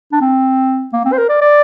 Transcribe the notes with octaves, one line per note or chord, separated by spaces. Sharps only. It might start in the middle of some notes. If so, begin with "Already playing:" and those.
D4
C4
A#3
C4
C5
A#4
D5
D5